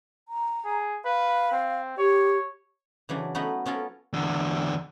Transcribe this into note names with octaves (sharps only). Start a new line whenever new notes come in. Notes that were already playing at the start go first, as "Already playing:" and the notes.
A#5
G#4
B4 F5
C4
G4 C#5
C#3 E3 F#3 D4
A3 B3 C#4 D#4 F#4 B4
B3 C#4 F4 A4 A#4
E2 D3